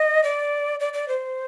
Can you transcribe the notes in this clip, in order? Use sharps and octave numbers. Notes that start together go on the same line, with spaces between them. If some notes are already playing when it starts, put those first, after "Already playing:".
Already playing: D#5
D5
D5
D5
C5